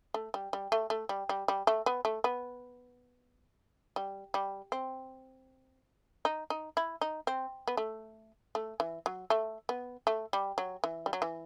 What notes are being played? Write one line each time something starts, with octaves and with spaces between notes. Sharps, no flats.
A3
G3
G3
A3
A3
G3
G3
G3
A3
B3
A3
B3
G3
G3
C4
D#4
D#4
E4
D#4
C4
B3
A3
A3
E3
F#3
A3
B3
A3
G3
F#3
E3
G3
F#3
E3